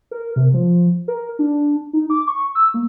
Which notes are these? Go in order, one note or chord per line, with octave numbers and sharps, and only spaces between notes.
A#4
C3
F3
A#4
D4
D#4
D6
C#6
E6
A#3